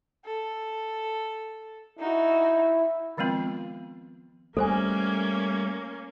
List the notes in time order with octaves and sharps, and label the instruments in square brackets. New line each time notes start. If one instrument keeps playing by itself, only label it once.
[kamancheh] A4
[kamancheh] D#4 F#4 [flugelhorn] E4
[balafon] D#3 F3 G#3 B3 C4 F4
[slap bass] G3 A3 [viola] A#3 C#4 [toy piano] A4 C5 G#5